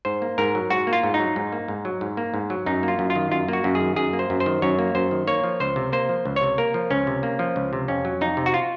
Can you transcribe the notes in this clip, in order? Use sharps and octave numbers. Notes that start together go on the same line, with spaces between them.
G#2 C5
A#3
G#2 A#4
F#3
G#2 F#4
A#3
F4
G#2
D#4
F#3
G#2
A#3
G#2
F#3
G#2
A#3
G#2
F#3
F#2 D#4
A#3
F4
F#2
F4
D#3
F#2 F4
A#3 F#4
F#2
G#4
D#3
F#2 G#4
A#3
C5
F#2
C5
D#3
F#2 C#5
A#3
F#2 C5
D#3
A#3 C#5
F3
C#2 C5
C3
A#3 C5
F3
C#2
C3 C#5
A#3 A#4
F3
C#2 C#4
C3
A#3
F3
C#2
C3
F2 C#4
F#3
F2 D#4
C3
F#4
F4